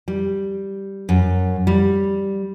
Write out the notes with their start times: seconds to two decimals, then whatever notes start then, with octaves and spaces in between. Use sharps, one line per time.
0.08 G3
1.09 F#2
1.67 G3